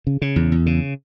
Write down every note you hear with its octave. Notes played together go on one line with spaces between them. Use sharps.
C#3
C#3
E2
E2
C#3